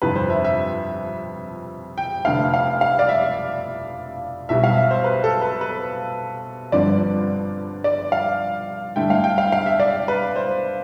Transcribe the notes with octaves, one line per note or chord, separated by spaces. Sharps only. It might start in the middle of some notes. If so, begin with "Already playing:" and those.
G1 F2 C3 F3 B4
C5
E5
E5
G5
F1 F2 D3 A3 F5
F5
F5
D5
E5
B1 B2 G3 E5
F5
E5
C5
B4
A4
B4
B4
G1 G2 D3 F3 C4 D5
D5
F5
G2 D3 A3 E4 G5
F5
G5
F5
F5
E5
D5
B4
C5